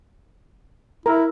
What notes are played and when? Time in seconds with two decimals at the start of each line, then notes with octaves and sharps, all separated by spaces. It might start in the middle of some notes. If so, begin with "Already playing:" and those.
1.06 E4 A#4